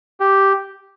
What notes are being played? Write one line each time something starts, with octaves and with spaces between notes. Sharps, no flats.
G4